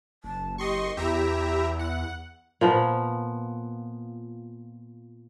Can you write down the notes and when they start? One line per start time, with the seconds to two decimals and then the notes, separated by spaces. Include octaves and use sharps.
0.24 F#1 A5
0.58 G4 D#5 C6 C#6
0.97 E2 E4 G4 E5 A#5
1.79 F#5
2.61 A#2 F3 B3